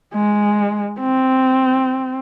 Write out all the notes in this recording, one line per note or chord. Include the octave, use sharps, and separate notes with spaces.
G#3
C4